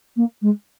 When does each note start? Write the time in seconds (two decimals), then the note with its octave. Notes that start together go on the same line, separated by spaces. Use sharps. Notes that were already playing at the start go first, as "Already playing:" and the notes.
0.16 A#3
0.42 G#3